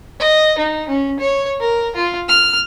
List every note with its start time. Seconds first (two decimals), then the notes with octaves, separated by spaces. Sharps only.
0.20 D#5
0.58 D#4
0.88 C#4
1.20 C#5
1.60 A#4
1.96 F4
2.28 F6